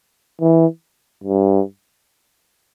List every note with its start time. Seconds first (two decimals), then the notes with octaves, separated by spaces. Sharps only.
0.41 E3
1.24 G2